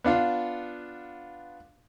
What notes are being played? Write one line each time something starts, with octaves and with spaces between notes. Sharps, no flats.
B3 D4 F4